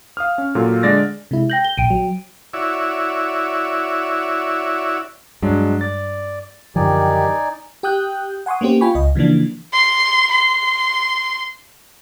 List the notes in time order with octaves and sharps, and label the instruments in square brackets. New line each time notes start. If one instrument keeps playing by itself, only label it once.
[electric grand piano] F5 D#6 F6
C#4
A#2 F#3 F4 A4
D3 G#3 D5 A6 A#6
[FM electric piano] C3 G#3 E4
[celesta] G5 A#6 F#7 [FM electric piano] G6
[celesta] G7
[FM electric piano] A#1 [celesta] G5 D7 D#7
[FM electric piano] F#3
[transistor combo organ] E4 F#4 C#5 D5 E5
[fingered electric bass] G2 [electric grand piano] F#3 G#3 D4
[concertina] D5 [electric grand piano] A6
[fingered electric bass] F#2 D3 F3 [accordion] D#3 G4 [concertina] D#4 D5 G#5
[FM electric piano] G4 G5 D#6 F#6 G6
F#5 G#5 C6 C#6 D#6
A#3 B3 C#4 G4 C5
F4 G5 G#5 B5 C#6
C#2 D#5
C#3 E3 F3 A#3 D4
[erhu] C6
C6